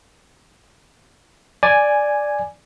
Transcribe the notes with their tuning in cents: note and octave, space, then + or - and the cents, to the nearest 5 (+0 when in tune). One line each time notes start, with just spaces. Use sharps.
D5 +0 G#5 +0